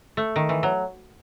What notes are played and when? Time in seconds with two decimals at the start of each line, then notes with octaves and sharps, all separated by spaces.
0.17 A3
0.36 D#3
0.49 E3
0.63 F#3